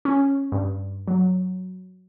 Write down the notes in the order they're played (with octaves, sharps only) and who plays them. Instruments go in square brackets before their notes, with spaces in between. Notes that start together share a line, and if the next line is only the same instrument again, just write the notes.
[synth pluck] C#4
G2
F#3